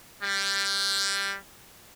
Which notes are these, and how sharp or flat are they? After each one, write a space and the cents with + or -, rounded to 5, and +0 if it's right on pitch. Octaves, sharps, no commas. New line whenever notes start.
G3 +10